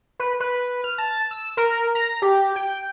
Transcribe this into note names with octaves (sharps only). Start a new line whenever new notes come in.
B4
B4
F6
A5
E6
A#4
A#5
G4
G5